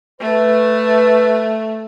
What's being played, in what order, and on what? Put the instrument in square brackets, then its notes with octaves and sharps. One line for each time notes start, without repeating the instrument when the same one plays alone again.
[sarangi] A3 [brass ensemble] B4